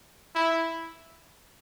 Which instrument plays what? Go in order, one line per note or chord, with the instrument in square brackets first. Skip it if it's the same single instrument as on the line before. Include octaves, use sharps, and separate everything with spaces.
[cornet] E4